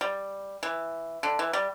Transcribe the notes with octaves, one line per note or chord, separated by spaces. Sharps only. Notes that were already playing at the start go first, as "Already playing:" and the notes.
G3
E3
D3
E3
G3